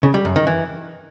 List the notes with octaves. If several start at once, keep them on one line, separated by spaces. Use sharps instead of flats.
C#3
G3
F#2
D#3
E3